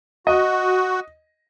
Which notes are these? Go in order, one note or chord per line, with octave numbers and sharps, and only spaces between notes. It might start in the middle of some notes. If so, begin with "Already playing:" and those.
F#4 D#5